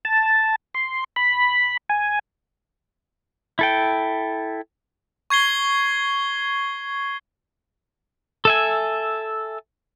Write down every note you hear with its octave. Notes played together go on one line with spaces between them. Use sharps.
A5
C6
B5
G#5
E4 A4 G5
C#6 G#6 C7 G7
A4 E5 G#5